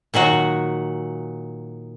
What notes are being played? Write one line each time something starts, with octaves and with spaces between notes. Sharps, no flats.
A#2 D#3 F#3 F#4